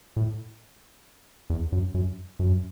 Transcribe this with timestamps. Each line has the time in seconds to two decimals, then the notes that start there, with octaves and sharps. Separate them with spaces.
0.17 A2
1.50 E2
1.72 F#2
1.94 F#2
2.39 F#2